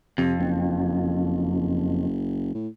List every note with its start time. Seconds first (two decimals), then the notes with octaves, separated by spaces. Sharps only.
0.18 F2 C3
0.39 F#1
2.54 A2